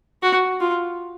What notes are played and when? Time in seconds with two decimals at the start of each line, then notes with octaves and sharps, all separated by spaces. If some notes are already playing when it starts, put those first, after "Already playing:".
0.23 F#4
0.60 F4